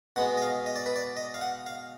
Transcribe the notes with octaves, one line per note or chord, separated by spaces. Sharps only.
B2 G#3 B3 F#5
D#5
F5
D#5
D5
B4
D5
D#5
F5
F#5
F5